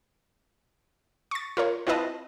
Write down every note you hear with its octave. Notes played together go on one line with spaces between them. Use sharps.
C#6 A6
F4 A#4 C#5
C4 E4 F4 B4 D#5 A5